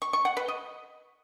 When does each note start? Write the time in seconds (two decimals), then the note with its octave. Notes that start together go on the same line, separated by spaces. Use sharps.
0.02 C#6
0.13 C#6
0.25 F#5
0.37 B4
0.48 D#5